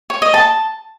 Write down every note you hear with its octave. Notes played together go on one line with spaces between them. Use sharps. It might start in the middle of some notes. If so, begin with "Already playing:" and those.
C#5
D#5
A5